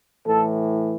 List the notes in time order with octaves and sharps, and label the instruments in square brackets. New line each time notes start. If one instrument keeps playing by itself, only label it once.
[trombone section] A2 E3 A4